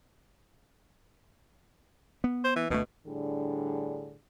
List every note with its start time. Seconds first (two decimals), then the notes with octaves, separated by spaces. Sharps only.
2.24 B3
2.44 C5
2.56 E3
2.70 D2 B2 A3
3.07 A2 D3 G3 D4 G#4